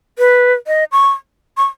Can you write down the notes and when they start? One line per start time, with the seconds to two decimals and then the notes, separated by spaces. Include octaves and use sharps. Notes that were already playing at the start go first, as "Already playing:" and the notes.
0.19 B4
0.67 D#5
0.92 C#6
1.57 C#6